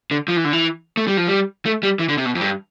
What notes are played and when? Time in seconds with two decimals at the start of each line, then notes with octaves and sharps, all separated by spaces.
0.11 D3
0.28 F3
0.37 E3
0.45 D3
0.53 E3
0.97 A3
1.07 G3
1.17 F3
1.27 G3
1.66 A3
1.83 G3
1.99 E3
2.09 D3
2.17 C3
2.25 B2
2.35 F2
2.41 G2